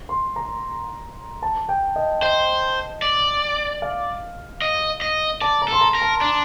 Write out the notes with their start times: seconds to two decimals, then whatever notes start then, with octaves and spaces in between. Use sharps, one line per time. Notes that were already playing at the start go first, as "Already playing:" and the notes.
0.09 C6
0.36 A#5
1.43 A5
1.69 G5
1.96 D#5
2.22 C5 D#5
3.02 D5
3.82 F5
4.62 D#5
5.01 D#5
5.41 D5 A5
5.62 A#5
5.68 A4 C6
5.81 A#5
5.95 A#4
6.02 A5
6.21 D4